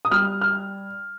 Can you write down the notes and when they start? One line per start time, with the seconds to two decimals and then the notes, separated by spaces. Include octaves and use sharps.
0.05 D#6
0.11 G3 F6
0.41 F6